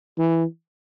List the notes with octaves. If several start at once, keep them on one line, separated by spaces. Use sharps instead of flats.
E3